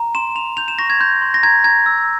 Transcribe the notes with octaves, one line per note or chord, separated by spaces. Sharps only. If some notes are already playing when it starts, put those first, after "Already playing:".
Already playing: A#5
C6 E7
C6 F7
G6 F7
E7
C#6 A#6
G#6
C6 G6
C6
A#6
A#5 G#6
A#5 G#6
E6